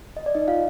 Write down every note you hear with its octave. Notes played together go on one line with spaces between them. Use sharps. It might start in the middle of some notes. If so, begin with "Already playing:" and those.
D#5
D5
D#4 D#5
F4 F5